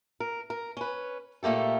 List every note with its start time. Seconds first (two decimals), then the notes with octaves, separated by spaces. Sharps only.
0.20 A#4
0.50 A#4
0.77 C#4 B4
1.43 A#2 A3 A#3 G4 A4